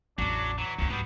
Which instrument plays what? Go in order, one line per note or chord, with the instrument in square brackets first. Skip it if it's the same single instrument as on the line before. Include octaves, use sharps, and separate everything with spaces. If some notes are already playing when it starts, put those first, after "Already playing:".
[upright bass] A1 E2 [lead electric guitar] F#3 [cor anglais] D4
[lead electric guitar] E3 [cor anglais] F#3
[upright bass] D2 D#3 [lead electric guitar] G2
[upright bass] G#2 [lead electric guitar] F#3 G3 [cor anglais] B3